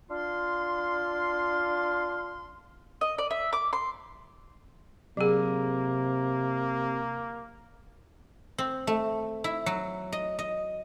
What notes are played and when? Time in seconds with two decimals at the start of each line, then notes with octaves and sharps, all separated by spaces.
0.11 D4 F4 F5 C6
3.01 D#5
3.18 D5
3.31 E5
3.53 D6
3.73 C6
5.17 C3 F#3 A#3 G#4
8.58 C4
8.87 A3
9.44 E4
9.66 F#3
10.12 D#5
10.39 D#5